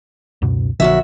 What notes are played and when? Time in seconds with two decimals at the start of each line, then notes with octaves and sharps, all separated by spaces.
0.42 C#2 F#2 B2
0.80 A#1 F#2 D3 F3 F#4 E5